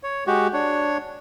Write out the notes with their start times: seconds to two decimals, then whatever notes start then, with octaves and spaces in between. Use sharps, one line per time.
0.03 C#5
0.27 G#3 F#4 G4
0.53 D4 C#5